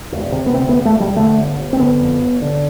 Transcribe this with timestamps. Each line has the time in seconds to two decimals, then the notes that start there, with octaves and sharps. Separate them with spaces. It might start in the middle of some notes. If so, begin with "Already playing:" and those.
0.12 E1
0.32 C3
0.46 B3
0.53 D2 C4
0.69 B3
0.74 E1
0.85 A3
0.95 E1 G3
1.16 D3 A3
1.38 G1
1.58 G1
1.73 C4
1.79 D3 B3
2.00 F2
2.21 G1
2.42 D3